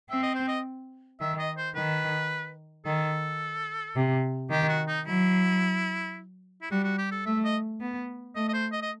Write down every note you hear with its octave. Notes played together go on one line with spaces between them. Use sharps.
C4 E5
D#5
C5
D#5
D#3 E5
D#5
C5
D#3 B4
D#3 A4
C3
D#3 G4
F#4
D#4
F#3 E4
E4
G3 F#4
F#4
G4
A4
A3 E5
D#5
B3
A3 D#5
D#5
C5
D#5
D#5